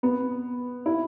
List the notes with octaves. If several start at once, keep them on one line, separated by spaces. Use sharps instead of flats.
B3
E4